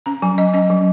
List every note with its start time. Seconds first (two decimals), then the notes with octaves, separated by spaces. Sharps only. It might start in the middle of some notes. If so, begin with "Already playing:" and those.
0.06 C#4 A#5
0.22 F#3 G#5
0.38 C#4 D#5
0.54 C#4 D#5
0.70 F#3